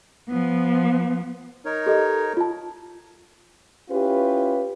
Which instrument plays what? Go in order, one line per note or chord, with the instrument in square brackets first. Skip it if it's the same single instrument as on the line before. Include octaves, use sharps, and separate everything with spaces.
[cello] F3 B3
[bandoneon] D#4 A#4 C#5
[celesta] G4 A4 D#5
F4 A5
[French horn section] C#4 E4 F4 G4 B4